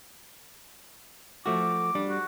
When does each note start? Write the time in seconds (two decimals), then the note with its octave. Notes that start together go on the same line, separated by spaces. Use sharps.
1.46 F3 A3 F#4 D6
1.95 G3 D4
2.09 F#4